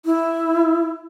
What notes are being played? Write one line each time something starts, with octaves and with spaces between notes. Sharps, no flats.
E4